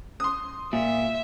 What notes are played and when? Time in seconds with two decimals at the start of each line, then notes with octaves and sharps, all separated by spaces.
0.20 C6 D#6
0.73 A#2 E5